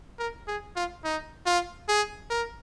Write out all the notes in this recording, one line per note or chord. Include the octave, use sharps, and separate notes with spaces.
A#4
G#4
F4
D#4
F4
G#4
A#4